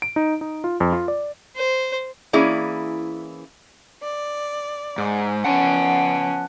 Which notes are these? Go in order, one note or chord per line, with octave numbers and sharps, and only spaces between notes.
D7
D#4
D#4
F4
F2
F4
D5
C5
E3 A#3 C#4 E4 G#4 D5
D5
G#2
F3 B3 C#4 F#5 A5